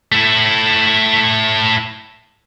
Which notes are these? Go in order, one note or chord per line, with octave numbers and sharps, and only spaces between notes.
A3 E4